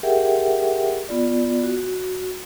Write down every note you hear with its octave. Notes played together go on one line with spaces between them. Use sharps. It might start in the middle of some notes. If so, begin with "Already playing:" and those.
G4 G#4 A#4 E5 F#5 G5
B3 F4 D5
F#4